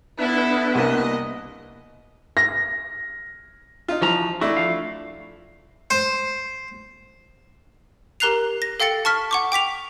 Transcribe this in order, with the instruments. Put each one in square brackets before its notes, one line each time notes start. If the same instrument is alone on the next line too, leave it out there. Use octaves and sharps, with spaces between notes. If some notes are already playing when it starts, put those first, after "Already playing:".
[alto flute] B3 [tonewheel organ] D4 B4 E5 [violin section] E4 A4
[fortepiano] C2 A#3 [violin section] D#5
[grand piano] A#6
[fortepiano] D#4 F4
[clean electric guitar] E3 F#4 A#5 [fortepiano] F3
[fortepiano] A3 D4 E4 [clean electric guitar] F#4
[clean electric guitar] F3 F5
[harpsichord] C5 C6
[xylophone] G4 A#4 A#5 F#6 C7 F7
A#6
A4 F5 G5 A6 C#7
A5 C#6 F6 B6
F#5 C#6 D6
G5 D6 B6 F7